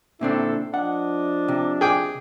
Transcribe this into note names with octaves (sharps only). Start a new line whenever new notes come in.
A#2 D3 C4 D4 E4 A4
F3 D4 D#5 F#5
C3
G#4 G5 D6